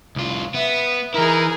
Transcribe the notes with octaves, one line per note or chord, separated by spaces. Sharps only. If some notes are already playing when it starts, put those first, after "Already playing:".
C2 F4
B3 E5
E3 D#4 E4 G#4 A#4